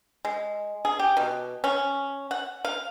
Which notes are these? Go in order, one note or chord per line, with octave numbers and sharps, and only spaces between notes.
G#3
G#4
G4
B2
C#4
F#5
F5